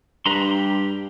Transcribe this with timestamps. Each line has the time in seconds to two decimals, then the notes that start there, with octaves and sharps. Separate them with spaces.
0.26 G2 B4 A#5 C6
0.47 G4